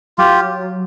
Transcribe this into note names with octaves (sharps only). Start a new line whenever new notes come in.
F#3 F4 G4